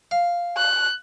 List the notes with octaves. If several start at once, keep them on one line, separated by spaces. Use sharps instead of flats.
F5
F#6